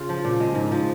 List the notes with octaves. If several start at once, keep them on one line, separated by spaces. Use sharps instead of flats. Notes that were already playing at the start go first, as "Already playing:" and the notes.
Already playing: C#3 F4
F3
A#2
G#3
G#2
F3